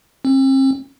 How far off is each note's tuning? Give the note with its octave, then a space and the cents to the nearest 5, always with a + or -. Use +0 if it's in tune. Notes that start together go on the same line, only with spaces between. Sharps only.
C4 +40